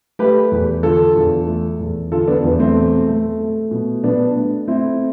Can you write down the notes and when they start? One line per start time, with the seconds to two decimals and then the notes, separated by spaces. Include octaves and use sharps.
0.19 A3 G4 B4
0.51 E2
0.83 D3 F4 A4
1.16 E2
1.47 A3
1.80 E2
2.12 D3 F4 A4
2.27 B3 D4
2.44 E2 B3
2.59 A3 C4
2.76 B2
3.08 A3
3.40 A3
3.71 B2
4.04 B2 B3 D4
4.36 A3
4.67 A3 C4 E4